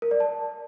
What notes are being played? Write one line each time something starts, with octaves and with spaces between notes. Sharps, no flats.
A#4
D5
A5